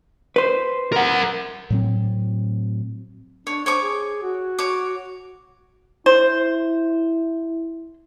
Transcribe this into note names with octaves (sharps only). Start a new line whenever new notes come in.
B4 C5
A#4 F#5
A2 F#3 C4
D4 C#5
C5 C#5 C#6 D6
G#4
F#4
C#5 D6
E4 C5